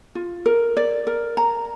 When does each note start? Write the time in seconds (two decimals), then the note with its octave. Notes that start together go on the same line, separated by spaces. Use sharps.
0.15 F4
0.46 A#4
0.77 D5
1.07 A#4
1.37 A#5